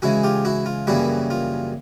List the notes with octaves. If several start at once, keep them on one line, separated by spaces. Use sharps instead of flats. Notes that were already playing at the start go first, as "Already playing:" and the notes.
C#3 E3 G#3 E4 F#4
F4 G4
E4 F#4
F4
F#2 C#3 E3 G3 A#3 E4 F#4
F4